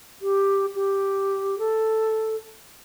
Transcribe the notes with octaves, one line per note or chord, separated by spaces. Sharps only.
G4
G4
A4